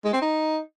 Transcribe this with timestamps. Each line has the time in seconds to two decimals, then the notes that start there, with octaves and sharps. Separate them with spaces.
0.04 G#3
0.13 C4
0.21 D#4